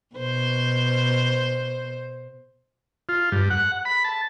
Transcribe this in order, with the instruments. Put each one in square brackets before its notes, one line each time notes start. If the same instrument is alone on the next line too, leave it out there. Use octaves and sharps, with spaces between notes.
[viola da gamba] B2 C5
[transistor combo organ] F4
G2
F#5
B5
A5